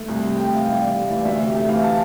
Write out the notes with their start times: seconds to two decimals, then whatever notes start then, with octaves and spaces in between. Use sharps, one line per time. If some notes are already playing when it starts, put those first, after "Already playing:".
Already playing: A3
0.08 C2
0.23 C3
0.37 A3 G5
0.51 E3 F5
0.66 C2 G5
0.81 C3 D5
0.95 A3 D5
1.10 E3 D5
1.25 D2 E5
1.39 C3
1.54 A3 E5
1.68 E3 F5
1.84 A5